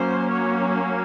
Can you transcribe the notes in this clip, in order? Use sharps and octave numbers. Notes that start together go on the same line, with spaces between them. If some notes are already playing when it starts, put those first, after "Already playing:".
Already playing: F#3 A#3 C#4 C5
C#5